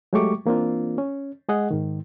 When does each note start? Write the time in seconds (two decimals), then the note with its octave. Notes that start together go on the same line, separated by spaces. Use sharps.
0.13 F#3 G#3 A3 G4 C#6 D6
0.46 E3 A#3 C4 D4 F4
0.98 C#4
1.49 G#3 G#4 D#5 F#5
1.71 G#2 D#3